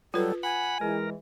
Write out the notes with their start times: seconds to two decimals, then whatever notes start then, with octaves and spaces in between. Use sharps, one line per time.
0.14 F#3 G3 F4 A4 B4
0.43 F#5 G#5 B5
0.81 E3 G#3 A#4